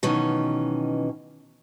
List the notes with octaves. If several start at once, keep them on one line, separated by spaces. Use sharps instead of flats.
B2 D#3 E3 F#3 C#4